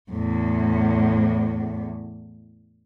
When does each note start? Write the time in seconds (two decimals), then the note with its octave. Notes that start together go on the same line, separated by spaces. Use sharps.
0.11 E2 A2